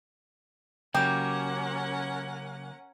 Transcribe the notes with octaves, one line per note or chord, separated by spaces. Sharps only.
C#3 F#3 A#3 C#4 G4 A#4 F#5